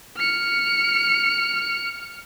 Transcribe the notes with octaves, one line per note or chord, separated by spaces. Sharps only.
F6 C#7